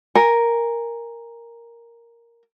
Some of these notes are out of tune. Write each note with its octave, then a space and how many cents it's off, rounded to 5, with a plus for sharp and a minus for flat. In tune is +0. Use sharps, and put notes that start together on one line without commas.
A#4 +0 G#5 -15